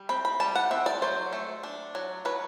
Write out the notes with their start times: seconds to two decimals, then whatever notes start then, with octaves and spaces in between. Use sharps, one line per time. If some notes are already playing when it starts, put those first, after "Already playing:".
Already playing: G3
0.09 C4 B5
0.25 B5
0.40 G3 A5
0.55 F#5
0.71 C4 E5
0.86 D5
1.02 F#3 C5
1.33 A3
1.63 D4
1.95 F#3
2.25 F#3 B4